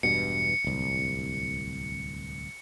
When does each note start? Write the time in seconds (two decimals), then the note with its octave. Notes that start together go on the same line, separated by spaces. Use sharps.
0.03 E1 G2 B2 C#7
0.64 D1 C2